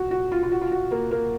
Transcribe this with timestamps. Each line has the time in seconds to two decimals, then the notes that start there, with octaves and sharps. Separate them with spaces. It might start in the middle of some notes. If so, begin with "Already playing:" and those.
Already playing: F#4
0.11 F#4
0.32 F4
0.43 F4
0.52 F#4
0.61 F4
0.72 F#4
0.91 A#3
1.11 A#3